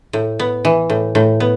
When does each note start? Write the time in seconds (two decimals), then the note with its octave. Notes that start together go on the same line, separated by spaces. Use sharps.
0.13 A2
0.40 B3
0.65 E3
0.90 A2
1.15 A2
1.40 B3